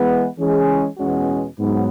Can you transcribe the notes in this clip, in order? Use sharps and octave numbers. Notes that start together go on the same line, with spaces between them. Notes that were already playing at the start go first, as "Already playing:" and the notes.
Already playing: E3 G#3 B3
E3 G#3 C#4 G#4
E2 B2 G#3 C#4 F#4
G#2 F#3 B3